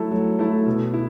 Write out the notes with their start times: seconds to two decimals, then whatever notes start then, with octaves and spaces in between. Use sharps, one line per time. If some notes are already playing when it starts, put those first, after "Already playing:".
Already playing: F#3 A3 E4 A4
0.12 F#3
0.39 A3 E4 A4
0.66 B2
0.93 E4